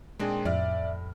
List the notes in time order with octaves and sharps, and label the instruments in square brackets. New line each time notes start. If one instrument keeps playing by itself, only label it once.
[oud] A#2 D#3 C4 [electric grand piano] G#3 D4 G#4
[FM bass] F2 [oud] A2 [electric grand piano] D5 F6 [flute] E5